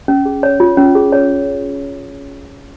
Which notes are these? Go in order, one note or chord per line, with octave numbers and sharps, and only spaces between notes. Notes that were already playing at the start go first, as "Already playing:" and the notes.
C#4
G#4
C#5
F4
C#4
G#4
C#5